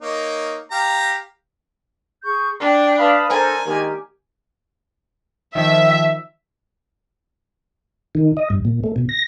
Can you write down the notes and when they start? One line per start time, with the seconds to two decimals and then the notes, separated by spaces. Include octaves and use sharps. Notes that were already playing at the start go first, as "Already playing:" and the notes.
0.02 A#3 D#4 C#5
0.71 G4 F5 A#5
2.23 G#4 C#6 G6
2.61 D4 G5
2.99 B4 F5 A5 B5 D#6
3.30 D4 A4 A#4 C5 G#5
3.66 D#3 G#3 A#3 G4
5.55 D#3 F3 E5
8.15 D#3
8.37 D#5
8.50 G2
8.65 A#2
8.84 A3
8.96 B2
9.09 A#6